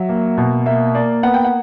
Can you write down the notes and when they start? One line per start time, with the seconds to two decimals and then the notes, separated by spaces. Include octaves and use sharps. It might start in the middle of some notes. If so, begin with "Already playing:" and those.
Already playing: F#3 E5
0.09 A#3
0.37 B2
0.66 A#3 E5
0.94 A#3 D5
1.23 B3 F#5
1.34 G5
1.44 F#5